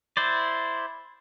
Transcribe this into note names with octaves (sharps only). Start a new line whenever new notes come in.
E4 C5 D5